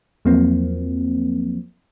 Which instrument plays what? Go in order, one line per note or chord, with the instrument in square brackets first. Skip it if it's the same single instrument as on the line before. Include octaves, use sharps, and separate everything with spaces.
[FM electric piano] E2 F3 F#3 A#3 C4